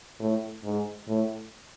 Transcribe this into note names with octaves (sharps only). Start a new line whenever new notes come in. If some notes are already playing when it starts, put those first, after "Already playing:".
A2
G#2
A2